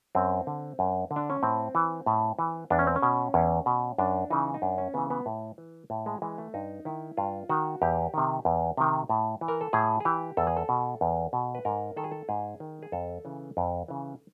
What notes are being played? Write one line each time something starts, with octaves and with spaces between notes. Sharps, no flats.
F#2 C4
D3
F#2
D3
D4
C#4
A2 C4
E3
A2
E3
E2 D4
C#4
C4
C#4
B2
E2
B2
F#2 D4
C#3 E3 D#4
D#4
F#2 D4
C#4
C#3 E3 B3
B3
A2
E3
A2
G#3
E3 G#3
A3
G2 D#4
D#3 E4
G2 F4
D#3 F#4
E2 G4
C3 D#3
E2
C3 D#3
A2
E3
A#4
A4
A2 G#4
G#4
E3 G4
E2 A4
G#4
A4
B2
E2
B2
B4
G#2 A#4
D#3 A4
G#4
A4
G#2 G#4
D#3
G#4
F2 A4
C#3 E3
F2
C#3 E3